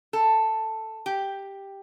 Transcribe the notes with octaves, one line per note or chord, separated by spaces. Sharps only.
A4
G4